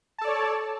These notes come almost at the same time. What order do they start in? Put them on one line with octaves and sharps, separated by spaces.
A5 A4 D5 C#5